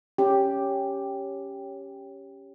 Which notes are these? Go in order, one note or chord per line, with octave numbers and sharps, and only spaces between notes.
C#4 G4